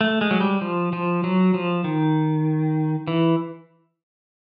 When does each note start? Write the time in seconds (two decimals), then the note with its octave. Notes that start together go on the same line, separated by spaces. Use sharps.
0.01 A3
0.21 G#3
0.31 F#3
0.41 G3
0.61 F3
0.93 F3
1.24 F#3
1.54 F3
1.84 D#3
3.07 E3